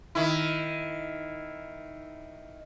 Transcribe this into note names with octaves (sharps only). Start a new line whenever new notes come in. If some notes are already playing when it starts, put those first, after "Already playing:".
D#3 E4